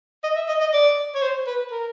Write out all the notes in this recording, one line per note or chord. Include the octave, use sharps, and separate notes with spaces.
D#5
E5
D#5
D#5
D5
C#5
C5
B4
A#4